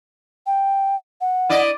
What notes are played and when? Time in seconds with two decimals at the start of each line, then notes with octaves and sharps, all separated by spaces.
0.47 G5
1.21 F#5
1.50 E4 D5 D#5